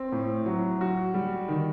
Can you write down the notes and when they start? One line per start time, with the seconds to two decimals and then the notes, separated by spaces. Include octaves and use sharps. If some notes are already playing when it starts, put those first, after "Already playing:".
Already playing: C4
0.12 A2
0.46 F#3
0.81 F#4
1.14 G3
1.48 D#3